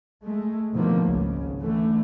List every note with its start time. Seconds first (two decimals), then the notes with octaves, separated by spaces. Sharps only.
0.23 G#3 A3
0.73 B2 D3 D#3 F3 A3 A#3
1.03 G#1 C#2 C#3
1.60 D3 E3 A3